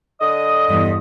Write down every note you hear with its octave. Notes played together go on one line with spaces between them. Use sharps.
D3 D#5 D#6
E2 G2